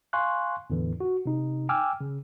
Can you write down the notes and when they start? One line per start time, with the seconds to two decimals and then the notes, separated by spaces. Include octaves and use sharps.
0.13 F5 G#5 C6 C#6 F#6
0.70 E2 A2 D3 E3
1.00 F#4
1.26 C3 D#4
1.69 G5 G#5 D6 E6 F6
2.01 C#3